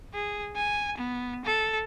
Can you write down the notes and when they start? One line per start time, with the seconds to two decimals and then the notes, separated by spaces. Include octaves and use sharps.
0.14 G#4
0.56 G#5
0.98 B3
1.45 A4